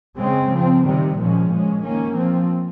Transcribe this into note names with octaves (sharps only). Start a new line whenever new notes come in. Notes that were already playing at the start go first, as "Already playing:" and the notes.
C#3 G#3 C4
F3 C4
C3 D#3 G3
A#2 F3 G#3 C#4
A#2 G#3 C#4
D#3 A#3 C#4
F3 C4